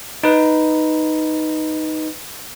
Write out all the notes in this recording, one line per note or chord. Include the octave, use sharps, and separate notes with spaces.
D#4 B4